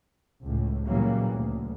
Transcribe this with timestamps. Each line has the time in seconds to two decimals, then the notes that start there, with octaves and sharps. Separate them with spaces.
0.42 C#2 A2
0.86 A#2 C#3 E3 F#3 G3 A#3
1.32 D2